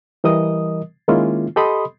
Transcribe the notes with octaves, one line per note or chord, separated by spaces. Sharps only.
E3 G3 A#4 D#5 D#6
D#3 G#3 A#3 C#4 E4 F4
G4 A4 D#5 B5 C6 D#6